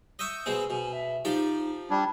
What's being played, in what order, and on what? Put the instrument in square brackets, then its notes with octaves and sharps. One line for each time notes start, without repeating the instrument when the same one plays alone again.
[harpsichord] D#5 E5 C#6 [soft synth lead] G6
[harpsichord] B2 G#3 C4
[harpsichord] B2 [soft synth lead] G#5
[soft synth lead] E5
[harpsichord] F3 G4 D5 [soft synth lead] D#4
[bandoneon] G3 D4 [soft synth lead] G#6